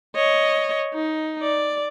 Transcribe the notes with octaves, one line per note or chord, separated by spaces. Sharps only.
C#5 D#5
D#4
D5